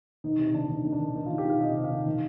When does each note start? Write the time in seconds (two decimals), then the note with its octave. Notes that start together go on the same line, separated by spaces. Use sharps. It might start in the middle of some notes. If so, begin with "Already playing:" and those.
0.24 D#3 D#4
0.39 C3 D#4
0.54 D#3 D4
0.69 D#3 D4
0.85 D#3
0.93 D4
1.00 D#3
1.15 D#3 D#4
1.26 D#3 F4
1.38 G4
1.45 D#3 F5
1.61 C3 D#5
1.76 C3
1.84 F5
1.91 D#3
2.06 D#3